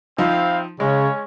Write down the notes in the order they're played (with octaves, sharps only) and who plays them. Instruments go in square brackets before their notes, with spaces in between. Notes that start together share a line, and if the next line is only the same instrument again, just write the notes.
[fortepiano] F3 D#4 [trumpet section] C4 E4 F5
[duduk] C#3 [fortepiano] G#3 [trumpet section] C#4 C#5